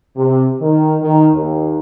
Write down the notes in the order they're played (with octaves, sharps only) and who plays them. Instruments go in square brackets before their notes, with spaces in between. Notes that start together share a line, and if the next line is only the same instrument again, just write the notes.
[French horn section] C3
D#3
D#3
D#2